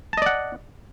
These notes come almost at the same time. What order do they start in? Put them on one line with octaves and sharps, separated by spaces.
A5 D#5 D5 F#5